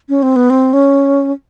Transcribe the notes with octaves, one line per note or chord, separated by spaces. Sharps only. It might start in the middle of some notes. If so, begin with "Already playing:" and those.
C#4
C4
B3
C4
C#4